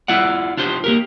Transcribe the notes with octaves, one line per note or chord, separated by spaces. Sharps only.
E4 F4 D5 F#5
D4 F4 G4 C5
A#3 G4 A#4